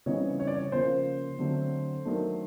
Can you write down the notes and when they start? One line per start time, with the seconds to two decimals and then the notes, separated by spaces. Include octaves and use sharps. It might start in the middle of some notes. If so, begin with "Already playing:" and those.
0.06 C#3 E3 G3 C4 D#4 C#5
0.40 C#5
0.47 D5
0.54 C#5
0.72 C#3 F3 A#3 C5
1.39 D3 F#3 A3 C4
2.05 D#3 F#3 A3 D4